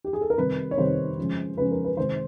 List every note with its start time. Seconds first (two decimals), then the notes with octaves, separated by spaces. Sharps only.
0.04 G4
0.13 G#4
0.21 A4
0.30 A#4
0.38 C3 D#3 G3 C4 B4
0.71 C#5
0.78 C3 D#3 G3 C4 C5
1.18 C#3 F3 G#3 C#4
1.57 C#3 F3 G#3 C#4 B4
1.71 A#4
1.84 B4
1.97 C3 D#3 G#3 C5